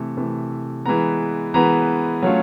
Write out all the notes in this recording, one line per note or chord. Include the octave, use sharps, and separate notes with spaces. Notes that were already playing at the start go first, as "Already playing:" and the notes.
Already playing: C3 E3 A3
C3 E3 A3
E3 G#3 B3 A#5
E3 G#3 B3 A#5
F#3 A3 C#4 F4